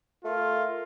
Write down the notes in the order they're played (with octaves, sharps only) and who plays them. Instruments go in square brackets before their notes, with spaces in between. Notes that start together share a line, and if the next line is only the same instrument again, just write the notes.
[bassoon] A3 [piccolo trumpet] F4 [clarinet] A#4